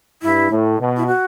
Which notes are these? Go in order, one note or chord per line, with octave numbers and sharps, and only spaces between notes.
G2 E4
A2
B2
E4
F#4